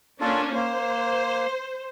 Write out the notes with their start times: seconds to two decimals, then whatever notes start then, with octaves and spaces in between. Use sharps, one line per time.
0.21 A#3 C#4 D4 F4 A4
0.55 A#3 C5